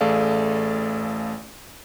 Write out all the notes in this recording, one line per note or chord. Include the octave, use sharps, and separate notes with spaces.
A1 A3 G#4 A4 D5 F5